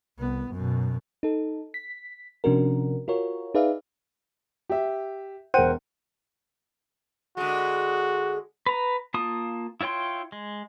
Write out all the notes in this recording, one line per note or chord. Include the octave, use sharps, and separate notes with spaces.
C2 B3
F#2 B2
D#4 A4
B6
C3 F3 C#4 D4 F#4 A#4
F4 F#4 A#4 C#5
D#4 G#4 B4 D5 E5 F5
G4 E5
E1 A#4 C5 F#5 G5 D#7
D3 G#3 F#4
B4 A#5
A#3 F4 A5 D#6
E4 F4 C#5 G5 C6
G#3